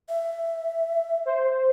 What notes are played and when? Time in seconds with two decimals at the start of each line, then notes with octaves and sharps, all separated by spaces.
0.09 E5
1.25 C5